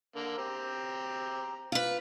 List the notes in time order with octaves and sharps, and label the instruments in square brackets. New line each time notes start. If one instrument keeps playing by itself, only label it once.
[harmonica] D3 A#3 A#4
C4 G4 A#5
[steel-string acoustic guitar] F4 B4